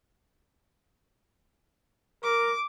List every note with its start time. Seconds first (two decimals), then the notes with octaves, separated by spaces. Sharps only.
2.23 A#4 D6